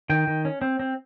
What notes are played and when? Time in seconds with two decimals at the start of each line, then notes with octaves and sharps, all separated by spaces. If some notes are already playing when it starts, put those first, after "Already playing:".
0.10 D#3 G5
0.27 D#3
0.45 C#4
0.62 C4
0.80 C4